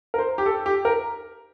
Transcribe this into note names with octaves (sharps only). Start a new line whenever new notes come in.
A#4
C5
G4
A4
G4
A#4